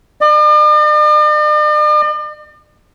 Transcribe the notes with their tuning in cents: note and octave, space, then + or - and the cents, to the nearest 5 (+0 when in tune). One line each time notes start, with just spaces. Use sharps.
D5 +45